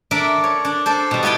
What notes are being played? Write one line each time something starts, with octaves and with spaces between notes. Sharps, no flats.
D4 A4 A#4 D5 E5
C#5
D4
D4 A4 C5
B2 G3
B3 E4 F4 B4 G5